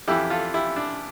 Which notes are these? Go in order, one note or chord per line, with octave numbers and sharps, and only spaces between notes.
F2 E3 E4 G4
F4 A4
E4 G4
D4